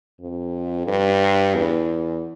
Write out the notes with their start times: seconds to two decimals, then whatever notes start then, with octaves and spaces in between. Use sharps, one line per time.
0.21 F2
0.88 G2
1.55 E2